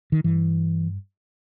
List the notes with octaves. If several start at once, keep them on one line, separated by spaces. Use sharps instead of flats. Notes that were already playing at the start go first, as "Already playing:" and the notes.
D#3
G2 E3